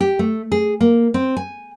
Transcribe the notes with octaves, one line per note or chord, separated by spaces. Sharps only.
G4
A3
G#4
A#3
C4
G#5